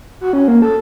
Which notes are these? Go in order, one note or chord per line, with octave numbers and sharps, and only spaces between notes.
F#4
C#4
A#3
A4